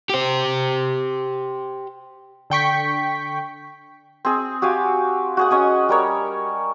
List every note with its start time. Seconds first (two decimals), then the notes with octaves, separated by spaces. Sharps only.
0.10 G4 C5
2.50 D3 G5 C#6 B6
4.25 C4 G#4
4.62 F#4 G4 F5 G#5
5.37 F#4 G#4 F#5
5.51 C#4 D#5 G#5
5.89 G3 A#4 C#5